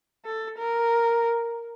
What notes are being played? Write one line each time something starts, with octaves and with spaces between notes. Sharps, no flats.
A4
A#4